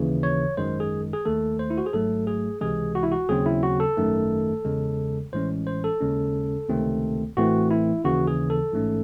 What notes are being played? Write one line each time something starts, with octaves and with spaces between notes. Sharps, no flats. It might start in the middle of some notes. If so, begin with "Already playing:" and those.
Already playing: D#2 C#3 E3
C#5
G#1 F#2 D#3 G#3 C5
G#4
G#4
D#2 D#3 A3 A4
C5
E4
F#4
G#4
G#1 G#2 F#3 A3 A4
G#4
C#2 C3 E3 G#3 G#4
F#4
E4
F#4
D#2 C#3 F#3 C4 G#4
E4
F#4
A4
G#1 F#2 D#3 A3
E2 C#3 G#3
A1 A2 E3 G#3 C#4 C5
C5
A4
D#2 C#3 G#3 C#4
C#2 C3 D#3 A3 C4
A1 A2 E3 A3 C4 F#4
E4
D#2 C#3 E3 F#4
G#4
A4
A1 G#2 E3 A3 C#4